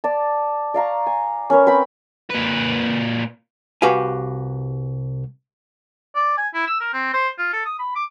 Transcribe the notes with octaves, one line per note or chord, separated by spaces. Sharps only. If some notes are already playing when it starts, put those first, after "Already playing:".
D5 A5
D5 F5 A#5 C#6
G#5
C#4 A#4 B4 C#5
C4 B4 G5 B5
A#2 B4
C2 F#4 G4 B4 F5 G#5
D5
G#5
E4
E6
A#4
C4
C5
F4
A4
D#6
B5
D6